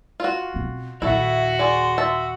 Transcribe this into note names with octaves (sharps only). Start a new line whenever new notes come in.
F4 F#4
B2 C4
A#1 D#2 E4 F#4 A4 E5
G#4 D5 C6
E5 A5